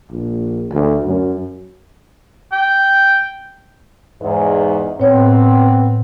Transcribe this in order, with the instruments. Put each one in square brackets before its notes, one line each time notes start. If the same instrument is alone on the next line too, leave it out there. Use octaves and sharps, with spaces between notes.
[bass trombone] A#1
D2
F#2
[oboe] G5
[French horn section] E2 G#2
[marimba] A2 C#5 [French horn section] B3 C4